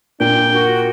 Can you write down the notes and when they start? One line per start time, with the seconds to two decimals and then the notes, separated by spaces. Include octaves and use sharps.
0.20 A#2 D4 G5
0.52 F#4 A#4